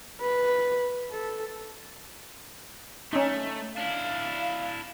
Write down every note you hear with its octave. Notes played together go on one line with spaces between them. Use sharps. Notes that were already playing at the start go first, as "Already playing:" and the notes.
B4
A4
A3 C#4 D#4
D4 E4 F5